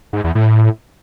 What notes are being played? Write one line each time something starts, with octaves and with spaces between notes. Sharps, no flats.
G#2
E2
A2